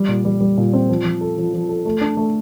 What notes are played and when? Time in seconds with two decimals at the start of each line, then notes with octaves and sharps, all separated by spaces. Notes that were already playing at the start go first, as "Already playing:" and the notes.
Already playing: G3
0.08 A#2
0.25 G3
0.40 G3
0.57 A#2
0.73 C4
0.89 F3
1.05 F3
1.21 A4
1.38 F3
1.53 F3
1.69 A4
1.85 A3
2.01 D4
2.17 A3